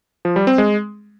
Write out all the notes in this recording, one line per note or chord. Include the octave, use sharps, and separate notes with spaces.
F3
G3
C4
G#3